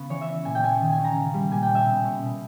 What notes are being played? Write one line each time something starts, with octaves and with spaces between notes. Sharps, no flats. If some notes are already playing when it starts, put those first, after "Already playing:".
Already playing: C#3 B3 C#4
E3 C#5
E5
C#4
A#2 G#5
G5
C#4 G#5
D#3
G#5
C#4
A#5
C#3
G3
A#2 G#5
G5
C#4
E5
B2
C#4
B2